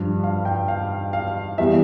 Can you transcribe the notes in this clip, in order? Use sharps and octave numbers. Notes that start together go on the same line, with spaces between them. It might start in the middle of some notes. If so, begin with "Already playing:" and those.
Already playing: G2 F3
F5
G5
F5
F5
E2 E3 G3 E5